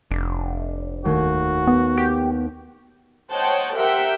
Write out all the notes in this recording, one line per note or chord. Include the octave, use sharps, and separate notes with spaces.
F1 D4
D#2 A3 F#4 G#6
B3
G4
C5 C#5 D#5 F#5 G5 A5
G4 A#4 C5 E5 F#5 G5